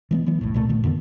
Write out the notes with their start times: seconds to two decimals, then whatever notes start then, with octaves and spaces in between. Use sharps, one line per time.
0.11 E3 G#3 B3
0.26 E3 F#3 G#3 B3
0.41 F1 B1 A2
0.54 C2 A#2 A3
0.69 A1 A#2 D#3 A3
0.84 F2 D3 D#3 B3